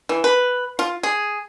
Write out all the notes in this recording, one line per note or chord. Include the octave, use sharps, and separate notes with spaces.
E3
B4
F4
G#4